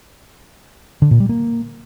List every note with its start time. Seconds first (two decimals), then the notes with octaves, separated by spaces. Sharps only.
1.02 D3
1.11 A#2
1.20 G3
1.29 A#3